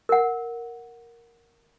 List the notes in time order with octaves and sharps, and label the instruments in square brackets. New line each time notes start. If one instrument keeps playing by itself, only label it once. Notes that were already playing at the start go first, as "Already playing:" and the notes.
[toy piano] A#4 F#5